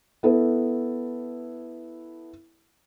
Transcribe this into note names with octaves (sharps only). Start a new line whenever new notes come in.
B3 E4 A4 B4